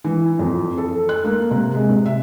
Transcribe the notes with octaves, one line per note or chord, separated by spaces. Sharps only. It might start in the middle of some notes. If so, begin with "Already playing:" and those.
E3
F2
A4
F#6
A#3
C3
G#3
C3
E5